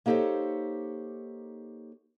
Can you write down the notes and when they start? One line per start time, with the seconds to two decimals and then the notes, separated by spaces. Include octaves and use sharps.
0.06 A#3 D#4 G4 A4 C5 C#5